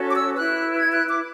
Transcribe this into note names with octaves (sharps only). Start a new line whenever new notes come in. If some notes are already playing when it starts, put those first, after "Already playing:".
Already playing: C#4 F#4 A4 C#5
D6
E6
E4 B4 F#6
G#6
F#6
D6